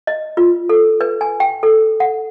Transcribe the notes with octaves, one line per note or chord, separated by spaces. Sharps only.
D#5
F4
A4
B4
G#5
G5
A4
F#5